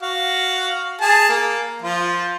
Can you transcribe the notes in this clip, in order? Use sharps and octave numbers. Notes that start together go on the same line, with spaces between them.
F#4 F5
G#4 A5
A#3
F3 F4